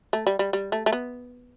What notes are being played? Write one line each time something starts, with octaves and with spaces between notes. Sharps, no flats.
A3
G3
G3
G3
A3
A3
B3